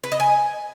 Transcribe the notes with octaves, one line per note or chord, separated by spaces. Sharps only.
B4
D#5
G#5